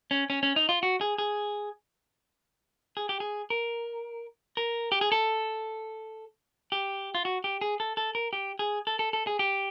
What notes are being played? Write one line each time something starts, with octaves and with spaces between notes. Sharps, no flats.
C#4
C#4
C#4
D#4
F4
F#4
G#4
G#4
G#4
G4
G#4
A#4
A#4
G4
G#4
A4
G4
F4
F#4
G4
G#4
A4
A4
A#4
G4
G#4
A4
A4
A4
G#4
G4